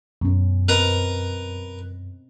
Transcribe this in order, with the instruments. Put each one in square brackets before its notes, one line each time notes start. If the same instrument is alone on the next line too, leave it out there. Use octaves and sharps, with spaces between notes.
[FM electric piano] F#2 [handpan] B2 C#4
[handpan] C4 D#5 [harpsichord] A#4 B4 A#5